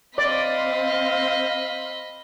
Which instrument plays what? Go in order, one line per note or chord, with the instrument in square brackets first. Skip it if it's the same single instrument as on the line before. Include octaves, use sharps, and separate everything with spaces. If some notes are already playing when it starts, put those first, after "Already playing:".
[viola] C4 F5 [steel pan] D5 [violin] D#5 B5